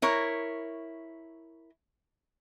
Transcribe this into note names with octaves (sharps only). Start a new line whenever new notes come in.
E4 A#4 C#5